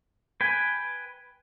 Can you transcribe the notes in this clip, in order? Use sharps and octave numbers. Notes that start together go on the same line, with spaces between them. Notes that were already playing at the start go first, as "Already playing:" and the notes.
B4 G5 G#5